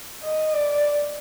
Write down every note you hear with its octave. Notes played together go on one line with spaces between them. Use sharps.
D#5
D5